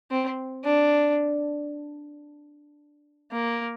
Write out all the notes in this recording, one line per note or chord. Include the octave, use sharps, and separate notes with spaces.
C4
D4
A#3